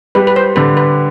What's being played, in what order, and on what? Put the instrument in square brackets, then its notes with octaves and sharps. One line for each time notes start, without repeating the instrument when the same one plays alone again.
[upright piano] G3 [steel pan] B4
[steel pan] B4
C5
[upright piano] D3 [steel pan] B4
[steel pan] B4